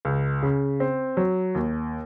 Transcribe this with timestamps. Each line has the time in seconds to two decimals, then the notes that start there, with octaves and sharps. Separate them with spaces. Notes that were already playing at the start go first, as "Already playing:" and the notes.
0.05 C#2
0.43 C#3
0.80 C4
1.17 F#3
1.55 D#2